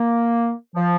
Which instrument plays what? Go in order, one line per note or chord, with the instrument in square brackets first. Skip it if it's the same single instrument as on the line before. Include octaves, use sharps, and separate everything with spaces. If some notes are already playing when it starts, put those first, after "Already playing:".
Already playing: [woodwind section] A#3
F3